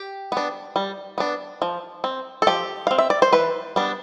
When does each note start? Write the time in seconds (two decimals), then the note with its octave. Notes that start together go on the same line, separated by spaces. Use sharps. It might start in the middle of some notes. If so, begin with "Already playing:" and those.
Already playing: G4
0.32 B3 D4
0.76 G3
1.18 B3 D4
1.62 F3
2.04 C4
2.42 A4
2.47 F3 G4
2.87 C4 F5
2.98 E5
3.10 D5
3.22 C5
3.32 E3 B4
3.76 G3 B3 D4